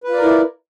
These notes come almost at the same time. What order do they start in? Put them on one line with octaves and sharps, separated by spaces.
B4 F4 D5 A#4 E4